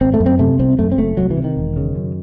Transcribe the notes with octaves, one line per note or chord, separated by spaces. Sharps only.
G#1 C4
A3
F#2
C4
C3 A3
C2 C4
F#2 A3
C4
F#1 A3
C2 F#3
E3
C3
D#3
E1
C#3
F#2